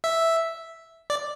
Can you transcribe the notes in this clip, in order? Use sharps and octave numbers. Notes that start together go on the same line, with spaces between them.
E5
D5